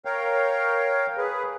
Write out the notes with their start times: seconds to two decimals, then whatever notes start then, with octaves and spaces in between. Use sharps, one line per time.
0.05 A#4 C#5 F5 G5
1.17 G#4 B4